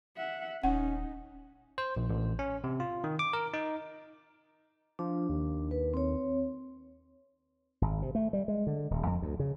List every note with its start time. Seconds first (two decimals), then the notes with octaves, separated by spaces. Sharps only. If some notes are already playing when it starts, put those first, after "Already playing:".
0.17 E5 F#5
0.63 D#1 C#4 D#4 F#5
1.78 C5
1.97 A#1
2.10 A1
2.39 C#4
2.64 C3
2.80 F4
3.04 D#3
3.19 D6
3.33 A#4
3.54 D#4
4.99 F3 D4
5.29 D#2
5.71 B4
5.94 C4 C#5
7.82 G#1
8.02 C3
8.15 A3
8.33 G3
8.48 G#3
8.67 D3
8.91 D#1
9.06 F2
9.22 D2
9.40 C#3